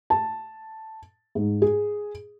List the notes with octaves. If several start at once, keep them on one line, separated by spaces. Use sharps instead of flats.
A5
G#2
G#4